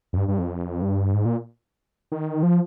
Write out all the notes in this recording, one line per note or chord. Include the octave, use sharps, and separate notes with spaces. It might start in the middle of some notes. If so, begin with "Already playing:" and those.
F2
G2
G2
F2
G2
G#2
A#2
D#3
F3